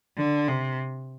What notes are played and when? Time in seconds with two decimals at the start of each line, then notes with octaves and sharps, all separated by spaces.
0.17 D3
0.48 C3